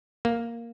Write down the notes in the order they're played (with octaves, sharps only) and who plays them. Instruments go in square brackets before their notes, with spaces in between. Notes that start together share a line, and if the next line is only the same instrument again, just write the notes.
[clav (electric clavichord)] A#3